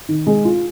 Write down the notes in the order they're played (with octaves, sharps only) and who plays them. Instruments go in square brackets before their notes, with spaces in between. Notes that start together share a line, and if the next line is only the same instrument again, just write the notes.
[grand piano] D#3
G#3
F4